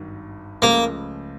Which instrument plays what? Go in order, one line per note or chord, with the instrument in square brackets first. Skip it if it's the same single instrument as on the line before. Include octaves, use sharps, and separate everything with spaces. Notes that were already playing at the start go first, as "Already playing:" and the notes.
Already playing: [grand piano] G#1 G2 D#3 F#3
[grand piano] C#2 C#3 F3 A3 [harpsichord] A#3